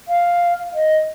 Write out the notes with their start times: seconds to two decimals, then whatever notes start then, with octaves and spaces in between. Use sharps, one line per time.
0.08 F5
0.73 D#5